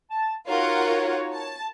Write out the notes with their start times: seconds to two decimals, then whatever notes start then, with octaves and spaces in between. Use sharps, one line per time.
0.11 A5
0.48 D#4 F4 F#4 A#4 C#5 F#5
1.34 A5